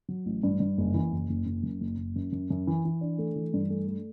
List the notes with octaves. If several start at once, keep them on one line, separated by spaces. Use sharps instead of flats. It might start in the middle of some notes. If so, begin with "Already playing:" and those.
F#3
A1
G2
G2
F#1
E3
F#1
F#1
F#1
F#2
F#1
F#1
F#2
F#2
F#2
E3
E3
D4
A3
E3
G2
A3
A3